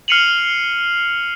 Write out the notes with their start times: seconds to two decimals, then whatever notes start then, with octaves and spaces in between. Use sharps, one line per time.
0.08 F6 C7 C#7 D#7 F7 F#7